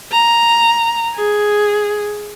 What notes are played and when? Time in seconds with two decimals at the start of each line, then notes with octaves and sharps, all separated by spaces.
0.12 A#5
1.15 G#4